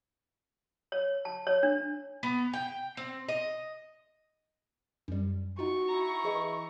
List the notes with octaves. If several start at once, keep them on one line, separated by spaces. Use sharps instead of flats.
C#5
A5
C#5
D4
B3
G5
C4
D#5
F#2 G3
D#4 F4 F#4 C#6
E4 A#5
E3 G#4 D#5